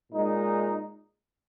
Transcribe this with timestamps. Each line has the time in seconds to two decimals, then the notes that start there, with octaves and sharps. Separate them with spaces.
0.12 A#2 G#3 D#4